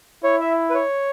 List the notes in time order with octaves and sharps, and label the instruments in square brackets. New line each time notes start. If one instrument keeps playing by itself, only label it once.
[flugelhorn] E4 [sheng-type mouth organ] C#5
[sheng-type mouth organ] E5
B4
C#5